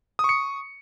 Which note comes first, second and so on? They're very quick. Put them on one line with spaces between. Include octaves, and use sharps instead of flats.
D#6 C#6 C#7